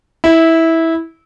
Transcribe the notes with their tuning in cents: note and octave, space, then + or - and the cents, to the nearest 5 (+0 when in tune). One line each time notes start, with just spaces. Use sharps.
E4 -15